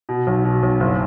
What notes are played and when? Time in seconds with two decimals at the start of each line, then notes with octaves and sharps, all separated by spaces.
0.09 B2
0.27 B1
0.44 B2
0.63 B1
0.80 F#1